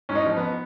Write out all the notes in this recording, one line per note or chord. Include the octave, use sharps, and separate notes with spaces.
G#2 C#4
D#4
F3
B3